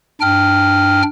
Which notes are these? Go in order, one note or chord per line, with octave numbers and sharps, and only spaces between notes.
G2 D4 G5 F6